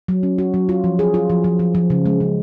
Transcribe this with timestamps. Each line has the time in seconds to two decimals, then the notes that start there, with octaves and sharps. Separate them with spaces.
0.08 F#3
0.23 C#4
0.38 F#4
0.54 F#3
0.69 F4
0.84 F3
0.99 G#4
1.14 F4
1.30 F3
1.44 F3
1.59 F3
1.75 F3
1.90 C#3
2.06 G#3
2.20 C#3